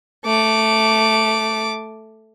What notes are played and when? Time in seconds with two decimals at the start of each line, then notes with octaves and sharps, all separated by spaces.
0.25 A3 D6